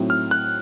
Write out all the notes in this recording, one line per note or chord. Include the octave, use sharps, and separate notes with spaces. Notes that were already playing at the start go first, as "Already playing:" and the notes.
Already playing: A2 F#3 C4 D#4
F6
F#6